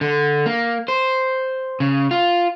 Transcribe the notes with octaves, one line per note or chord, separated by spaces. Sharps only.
D3
A#3
C5
C#3
F4